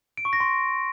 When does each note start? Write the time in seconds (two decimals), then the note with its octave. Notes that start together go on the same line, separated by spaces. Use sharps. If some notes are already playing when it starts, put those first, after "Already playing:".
0.17 D7
0.25 C#6
0.33 A#6
0.40 C6